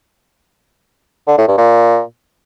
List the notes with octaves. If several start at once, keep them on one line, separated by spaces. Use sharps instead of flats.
D3
A2
G2
A#2